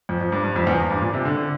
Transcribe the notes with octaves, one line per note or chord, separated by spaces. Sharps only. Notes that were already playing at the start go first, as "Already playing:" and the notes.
F2
F2
G2
G2
F2
E2
G2
A#2
C3
D3
D3